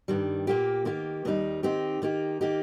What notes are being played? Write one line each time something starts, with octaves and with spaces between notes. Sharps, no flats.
G2 D#3 G3
A#2 A#3 G4
D#3 A#3 G4
D#2 D#3 G3 D#4
D#3 C4 D#4 G4
D#3 A#3 D#4 G4
D#3 A#3 D#4 G4